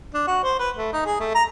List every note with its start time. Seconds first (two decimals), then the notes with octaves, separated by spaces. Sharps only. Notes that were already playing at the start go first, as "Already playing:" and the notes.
0.14 D4
0.27 F#4
0.43 C5
0.59 B4
0.76 A3
0.93 D#4
1.05 G#4
1.20 A3
1.35 A#5